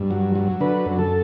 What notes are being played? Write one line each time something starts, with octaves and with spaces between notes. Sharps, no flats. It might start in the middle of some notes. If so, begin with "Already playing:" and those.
Already playing: G2
F#3
F#3
D3 B4
F#2
A4